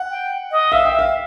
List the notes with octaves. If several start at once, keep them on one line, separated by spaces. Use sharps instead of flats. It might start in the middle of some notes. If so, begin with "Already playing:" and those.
Already playing: F#5
G5
D#5
E5 F5
G5
E5
F5